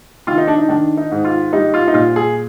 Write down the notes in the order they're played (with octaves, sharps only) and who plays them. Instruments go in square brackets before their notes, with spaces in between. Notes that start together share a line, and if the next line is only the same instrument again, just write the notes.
[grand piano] D#3 F4
D#4
D4
D#4
D#3 D4
D#4
G#2
F4
G3 D#4
F4
D#4
A#2 F4
G#4